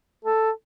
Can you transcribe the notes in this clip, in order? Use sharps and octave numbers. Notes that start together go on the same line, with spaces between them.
A4